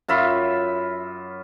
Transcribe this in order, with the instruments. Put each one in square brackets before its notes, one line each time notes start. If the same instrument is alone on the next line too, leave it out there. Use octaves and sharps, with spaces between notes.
[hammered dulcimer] F#2 F4 E5 B5